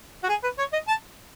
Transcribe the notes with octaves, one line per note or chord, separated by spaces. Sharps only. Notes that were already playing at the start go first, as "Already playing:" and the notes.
F#4
G#4
B4
C#5
D#5
A5